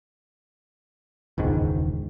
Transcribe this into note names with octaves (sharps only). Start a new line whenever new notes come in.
E1 C#2 G#2 D#3